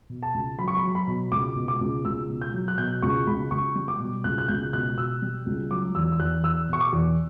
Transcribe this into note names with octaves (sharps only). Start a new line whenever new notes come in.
B2
A5
C#2
F#3 B5
C#6
B5
F#3
B5
B2
C#2 D6
B2
D6
C#2
C#2 E6
B2
G6
F#3
F#6
B2 G6
C#2 C#6
C#2 B5
C#2 C#6
G3
D6
B2
C#2 F#6
F#6
C#2 G6
B2 F#6
B2 E6
G3
C#2
F#3 D6
E2 E6
E6
E2 F#6
E2 E6
B2 C#6
D6
E2